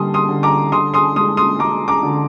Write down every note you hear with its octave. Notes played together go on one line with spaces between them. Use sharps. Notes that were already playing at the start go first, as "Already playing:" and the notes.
Already playing: D3 G3 A#3 C6 D#6
C6 D#6
D3
A#5 D6
D3 C6 D#6
C6 D#6
G#3 C6 D#6
C6 D#6
G#3 A#5 D6
A#5 D6
D3